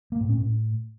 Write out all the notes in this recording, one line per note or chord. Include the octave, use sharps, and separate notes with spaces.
A#3
A2
C#4
A2